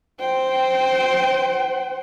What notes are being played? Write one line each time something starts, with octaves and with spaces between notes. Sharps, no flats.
C5 G5